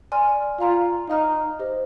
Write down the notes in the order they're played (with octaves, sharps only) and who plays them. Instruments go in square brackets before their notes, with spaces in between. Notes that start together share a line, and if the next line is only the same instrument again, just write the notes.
[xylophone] D5 G#5 C6 F6
[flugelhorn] F4 [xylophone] F5 A#5 F6
[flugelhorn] D#4 [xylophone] F5 A#5 F6
[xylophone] G4 C5 D#5